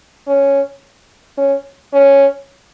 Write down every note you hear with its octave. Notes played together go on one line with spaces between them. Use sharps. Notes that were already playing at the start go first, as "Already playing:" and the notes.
C#4
C#4
C#4